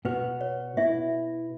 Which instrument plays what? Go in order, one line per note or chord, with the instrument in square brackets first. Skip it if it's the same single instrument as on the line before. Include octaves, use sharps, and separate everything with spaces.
[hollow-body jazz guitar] B2 B3 F#4 [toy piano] B4
[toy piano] C#5
[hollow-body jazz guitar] B2 B3 E4 [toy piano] E5